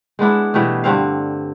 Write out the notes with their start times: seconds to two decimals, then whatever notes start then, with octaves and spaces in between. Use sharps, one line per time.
0.19 G#3 B3 D4 E4
0.54 B2 E3 G3 A3
0.84 G2 D3 C4 F5